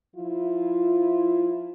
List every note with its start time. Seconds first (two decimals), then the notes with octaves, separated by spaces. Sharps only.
0.16 F3 E4 F4